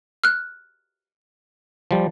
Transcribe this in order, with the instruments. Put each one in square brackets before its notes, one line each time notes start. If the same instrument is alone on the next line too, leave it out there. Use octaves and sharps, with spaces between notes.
[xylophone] F6 F#6
[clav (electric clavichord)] F3 G3